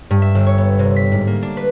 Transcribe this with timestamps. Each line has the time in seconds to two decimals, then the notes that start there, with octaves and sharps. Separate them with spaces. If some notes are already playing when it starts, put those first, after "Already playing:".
0.11 G2
0.22 E5
0.35 G1
0.47 C#5
0.58 B3
0.79 C3
0.96 B6
1.11 G#2
1.27 A#3
1.42 D4
1.57 B4